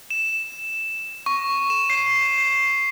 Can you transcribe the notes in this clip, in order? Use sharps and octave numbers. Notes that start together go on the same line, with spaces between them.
E7
C#6
E7
C7
C7